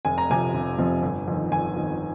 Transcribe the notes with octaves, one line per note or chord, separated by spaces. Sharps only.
F1 G#5
A#5
F2 C3 F3 G#5
F1
F2 C3 F3
G1
F2 D#3
G1 G#5
F2 D#3